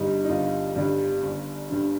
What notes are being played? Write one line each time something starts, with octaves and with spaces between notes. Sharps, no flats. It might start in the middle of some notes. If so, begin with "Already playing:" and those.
Already playing: G1 G2 D3 G3 D#4
D#4
G1 F4
G2 D3 G3 D4
G1
G2 D3